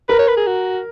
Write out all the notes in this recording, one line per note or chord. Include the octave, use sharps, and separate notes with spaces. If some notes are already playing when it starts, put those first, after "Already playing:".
A#4 B4
C#5
B4
G#4
F#4